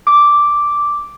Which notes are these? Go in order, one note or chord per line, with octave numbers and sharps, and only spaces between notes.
D6